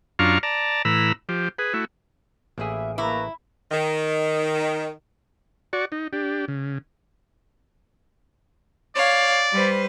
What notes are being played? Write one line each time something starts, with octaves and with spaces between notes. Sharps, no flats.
F#2 D4 F4 F5 A#5 C#6
D5 A5 A#5
A2 E3 A#5 B5 E6
F3 G4
G#4 B4
A3 E4 F#4
A1 A#3 E4 G#4 E5
A3 A#3 E4 B4 A#5 D6
D#3
F#4 D5 C#6
D#4
D4 G4
C#3
C#5 D5 F5
G3 B4 C5